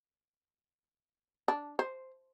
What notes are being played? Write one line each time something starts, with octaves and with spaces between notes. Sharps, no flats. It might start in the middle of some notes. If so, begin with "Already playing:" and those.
D4
C5